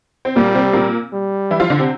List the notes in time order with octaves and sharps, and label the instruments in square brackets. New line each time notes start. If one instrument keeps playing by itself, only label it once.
[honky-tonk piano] C4
[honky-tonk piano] A#2 A#3 [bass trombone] G3
[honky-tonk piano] C3 C4
A#2 A#3
[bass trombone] G3
[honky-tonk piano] E3 E4
F3 F4
D3 D4
C3 C4